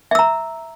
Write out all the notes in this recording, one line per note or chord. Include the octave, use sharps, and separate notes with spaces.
E5 A#5 E6